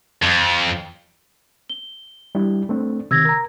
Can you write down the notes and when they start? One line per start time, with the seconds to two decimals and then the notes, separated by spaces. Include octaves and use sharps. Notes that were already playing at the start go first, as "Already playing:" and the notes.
0.23 F2
1.69 G7
2.35 G3 D4 E4
2.69 A3 C4 D4
3.11 C3 D#3 E6 G#6 A#6
3.25 A#4 A#5